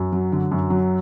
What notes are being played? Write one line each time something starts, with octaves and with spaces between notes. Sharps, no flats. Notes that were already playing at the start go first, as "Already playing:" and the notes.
Already playing: F#2
F#3
D3
F#2
F#3